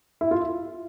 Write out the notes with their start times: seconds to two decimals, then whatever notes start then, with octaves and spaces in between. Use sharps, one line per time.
0.21 E4
0.31 F4